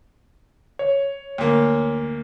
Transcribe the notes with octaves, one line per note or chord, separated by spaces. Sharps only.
C#5
D2 A#3